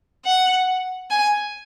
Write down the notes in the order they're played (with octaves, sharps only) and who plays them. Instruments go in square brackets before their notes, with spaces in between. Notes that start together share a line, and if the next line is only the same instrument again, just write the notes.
[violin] F#5
G#5